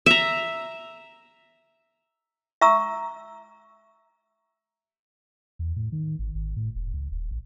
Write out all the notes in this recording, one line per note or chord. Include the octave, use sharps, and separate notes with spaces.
E5 A#5
E5 A#5 C#6 E6
E2
A2
D#3
G#1
G#1
A2
E1
C#2
D#1
A1